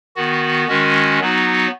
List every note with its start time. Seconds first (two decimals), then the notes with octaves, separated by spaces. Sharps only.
0.16 D#3 B3 F#4
0.68 D#3 G#3 C#4 F#4
1.20 F#3 B3 D#4 F#4